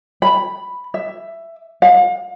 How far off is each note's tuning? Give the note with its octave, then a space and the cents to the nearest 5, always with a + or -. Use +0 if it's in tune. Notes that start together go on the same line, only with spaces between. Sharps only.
B5 +0
E5 +10
F5 +40